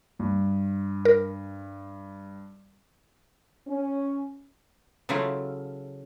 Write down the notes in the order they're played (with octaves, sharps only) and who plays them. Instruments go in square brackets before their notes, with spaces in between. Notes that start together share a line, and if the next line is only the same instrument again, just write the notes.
[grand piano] G2
[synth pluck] A#4
[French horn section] C#4
[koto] C#3 F#3 A3 E4 F4